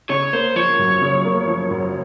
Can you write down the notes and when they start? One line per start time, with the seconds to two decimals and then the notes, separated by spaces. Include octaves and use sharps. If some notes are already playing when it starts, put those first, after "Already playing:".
0.10 C#3 C#5
0.33 A#3 C5
0.56 F3 C#5
0.79 F#2
1.02 C#3
1.25 A#3
1.48 F3
1.71 F#2